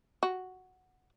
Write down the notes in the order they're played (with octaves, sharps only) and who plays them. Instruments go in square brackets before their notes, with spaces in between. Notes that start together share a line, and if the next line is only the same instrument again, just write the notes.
[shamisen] F#4